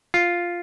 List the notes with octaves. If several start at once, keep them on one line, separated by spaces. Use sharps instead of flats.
F4